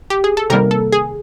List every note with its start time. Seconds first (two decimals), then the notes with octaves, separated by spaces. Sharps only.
0.10 G4
0.24 G#4
0.37 A4
0.50 C3 D#3 G3 A#3 A#4
0.71 A4
0.92 G#4